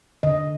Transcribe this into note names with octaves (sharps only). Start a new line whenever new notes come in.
D3 D#5